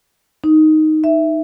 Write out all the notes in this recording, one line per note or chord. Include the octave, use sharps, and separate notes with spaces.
D#4
E5